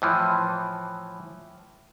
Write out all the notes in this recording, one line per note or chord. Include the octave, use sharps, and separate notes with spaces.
A2 E3 F3